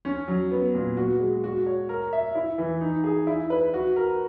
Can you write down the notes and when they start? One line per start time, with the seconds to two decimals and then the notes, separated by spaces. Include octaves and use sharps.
0.05 C#4
0.28 F#3
0.51 B3
0.75 A#2
0.97 F#4
1.20 G#3
1.44 F#4
1.66 C#5
1.89 A#4
2.13 E5
2.35 E4
2.58 E3
2.81 D#4
3.04 G#4
3.27 E4
3.50 B4
3.74 F#4
3.96 A#4